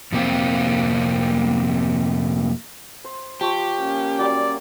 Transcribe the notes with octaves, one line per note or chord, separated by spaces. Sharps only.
F2 C3 A#3 C4 F4
C5
F3 G4 C#6
A#3 C#4
F#3 G3 D5